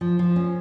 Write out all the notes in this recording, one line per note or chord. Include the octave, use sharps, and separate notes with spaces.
F3
F3
C#4